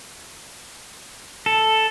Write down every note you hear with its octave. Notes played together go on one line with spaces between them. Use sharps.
A4